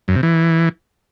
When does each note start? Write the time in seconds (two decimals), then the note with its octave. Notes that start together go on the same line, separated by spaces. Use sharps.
0.08 F#2
0.15 C3
0.23 E3